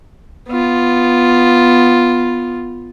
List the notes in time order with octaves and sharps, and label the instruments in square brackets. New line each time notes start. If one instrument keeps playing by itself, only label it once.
[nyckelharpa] B3 F4